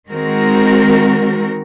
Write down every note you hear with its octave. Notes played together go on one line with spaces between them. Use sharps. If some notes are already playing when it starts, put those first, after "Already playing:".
D#3 G#3 C4 F#4 A#4